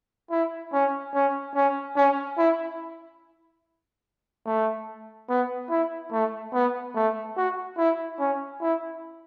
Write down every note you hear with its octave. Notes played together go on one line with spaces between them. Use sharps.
E4
C#4
C#4
C#4
C#4
E4
A3
B3
E4
A3
B3
A3
F#4
E4
C#4
E4